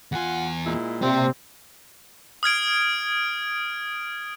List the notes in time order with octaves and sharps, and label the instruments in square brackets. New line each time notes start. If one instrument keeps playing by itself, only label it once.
[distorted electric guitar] E2 G#5 [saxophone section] F4 F#5
[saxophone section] A#2 G#3 E4
[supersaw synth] C3 [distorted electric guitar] A#3 D5 [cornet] C4
[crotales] D#6 F6 G#6 D7